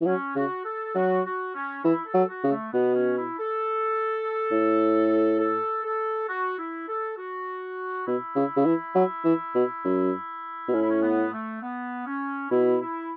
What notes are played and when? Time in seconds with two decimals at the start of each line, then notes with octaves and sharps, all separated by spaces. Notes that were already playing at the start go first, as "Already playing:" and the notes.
0.01 E3
0.06 F#3 C#4
0.36 C#3 F#4
0.65 A4
0.95 F#3 F#4
1.25 F#4
1.55 C#4
1.84 E3 E4
2.06 A4
2.14 F#3
2.29 F#4
2.44 C#3
2.51 A3
2.73 B2 B3
2.95 C#4
3.17 E4
3.39 A4
4.51 A2
5.39 A4
5.84 A4
6.28 F#4
6.58 E4
6.88 A4
7.18 F#4
8.06 B2 E4
8.35 C#3
8.56 C#3
8.65 E3
8.95 F#3
9.24 E3
9.54 B2
9.85 F#2
10.68 B2
10.73 A2 C#4
10.82 E4
10.90 C#4
11.02 B3
11.33 A3
11.62 B3
12.06 C#4
12.51 B2 E4
12.81 E4